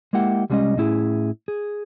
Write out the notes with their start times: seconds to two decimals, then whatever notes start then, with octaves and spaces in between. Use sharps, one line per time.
0.13 G#3 A#3 E4 G4 F#5
0.50 C2 G3 G#3 A#3 C#4 D#5
0.77 A2 C#4 E4 G#4
1.48 G#4